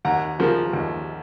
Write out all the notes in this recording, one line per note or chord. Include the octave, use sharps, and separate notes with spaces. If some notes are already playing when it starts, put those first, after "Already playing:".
D#2 F#5 A#5
C#3 F3 A#3
D#2